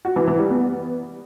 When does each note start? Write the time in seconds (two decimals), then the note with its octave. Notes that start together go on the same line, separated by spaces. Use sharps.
0.05 F#4
0.16 E3
0.28 E3
0.39 G3
0.50 B3